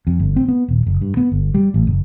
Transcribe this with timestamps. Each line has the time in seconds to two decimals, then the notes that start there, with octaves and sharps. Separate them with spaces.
0.07 F2
0.19 G1
0.36 C4
0.48 B3
0.68 D#1
0.87 F#1
1.01 G2
1.17 B3
1.32 G1
1.54 G3
1.74 A1
1.87 F#1